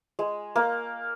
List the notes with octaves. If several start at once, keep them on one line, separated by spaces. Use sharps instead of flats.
G#3
A#3